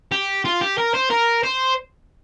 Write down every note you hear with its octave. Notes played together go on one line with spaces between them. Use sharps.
G4
F4
G4
A#4
C5
A#4
C5